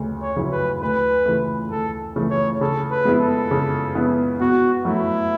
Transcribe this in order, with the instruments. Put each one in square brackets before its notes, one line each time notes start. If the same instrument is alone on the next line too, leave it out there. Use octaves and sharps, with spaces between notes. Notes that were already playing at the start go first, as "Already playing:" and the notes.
Already playing: [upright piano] D2 C#3
[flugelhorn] C#5
[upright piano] C#3 F#3 C#4 E4
[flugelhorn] B4
[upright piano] D2 [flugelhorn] B4
[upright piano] C#3 E3 A3
[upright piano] D2 [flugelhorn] A4
[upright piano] C#3 E3 A3
[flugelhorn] C#5
[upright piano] C#3 [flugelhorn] A4
[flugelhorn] B4
[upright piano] G#3 B3 E4
[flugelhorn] A4
[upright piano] C#3
G#3 B3 E4
[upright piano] B2 [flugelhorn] F#4
[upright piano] F#3 A3 [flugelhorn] E4